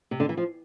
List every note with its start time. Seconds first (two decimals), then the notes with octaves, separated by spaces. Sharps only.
0.11 C3
0.20 D3
0.29 E3
0.37 F3